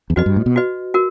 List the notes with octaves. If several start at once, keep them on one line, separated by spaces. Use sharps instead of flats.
E2
F2 F#4 B4 D#5
G2
A2
B2
F#4 B4 D#5
F#4 A#4